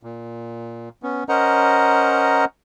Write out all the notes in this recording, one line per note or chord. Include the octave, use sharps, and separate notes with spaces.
A#2
B3 C#4
C#4 A#4 C5 D#5 F#5 A#5